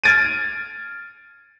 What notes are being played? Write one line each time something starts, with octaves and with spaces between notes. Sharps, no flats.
F6 G#6 A6 D7 D#7